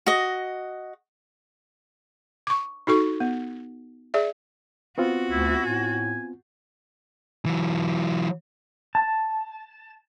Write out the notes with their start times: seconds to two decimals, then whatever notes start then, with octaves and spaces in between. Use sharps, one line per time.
0.06 F#4 D#5
2.47 C#6 D6
2.87 D#4 F#4 A4 C#6
3.20 B3
4.14 G#4 D5 E5
4.98 B3 C4 F4 F#4
5.31 D2 E4
5.65 A2 G#5
7.46 E3 F#3
8.95 A5